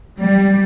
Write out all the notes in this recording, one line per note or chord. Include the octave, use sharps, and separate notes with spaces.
G3